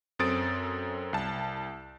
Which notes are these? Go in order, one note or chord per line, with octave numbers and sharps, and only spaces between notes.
F#2 C4 A4 D#6 A6 D7
C2 A5